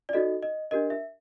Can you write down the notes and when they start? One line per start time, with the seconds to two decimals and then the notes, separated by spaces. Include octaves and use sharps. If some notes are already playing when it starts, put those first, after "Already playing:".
0.09 D5
0.13 D#4 F#4 A4 D#5
0.43 D#5
0.71 D4 G4 A#4 D#5
0.90 E5